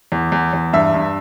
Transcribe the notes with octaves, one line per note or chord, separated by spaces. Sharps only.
E2
E2
E2
G2 E5
G2